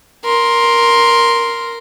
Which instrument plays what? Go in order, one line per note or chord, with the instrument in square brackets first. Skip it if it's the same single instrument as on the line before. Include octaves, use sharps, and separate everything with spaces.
[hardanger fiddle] A#4 C6